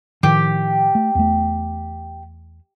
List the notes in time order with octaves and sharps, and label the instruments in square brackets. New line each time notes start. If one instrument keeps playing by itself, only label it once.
[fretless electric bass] A2 D#3 F3 [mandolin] G4
[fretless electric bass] A3
E2 A3